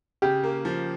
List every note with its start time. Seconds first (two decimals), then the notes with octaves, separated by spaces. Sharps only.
0.22 C#3 G4
0.43 A#3
0.65 F3